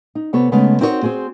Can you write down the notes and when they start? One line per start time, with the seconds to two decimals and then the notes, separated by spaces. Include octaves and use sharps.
0.15 D#4
0.33 C3 B3 A4 C#5
0.52 C#3 G#3 A3 B3
0.81 C4 D#4 F#4 A#4 B4 C#5
1.03 C4 F#4 G#4 C5